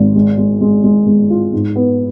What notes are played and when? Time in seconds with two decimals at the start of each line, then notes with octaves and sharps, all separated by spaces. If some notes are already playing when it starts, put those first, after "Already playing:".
Already playing: G#1
0.15 G#3
0.38 G#3
0.61 G#3
0.84 G#3
1.07 G#3
1.30 F4
1.53 G#2
1.76 B3